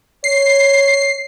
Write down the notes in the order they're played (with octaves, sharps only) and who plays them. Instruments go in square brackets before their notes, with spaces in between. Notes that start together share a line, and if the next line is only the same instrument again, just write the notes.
[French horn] C#5 [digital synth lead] C7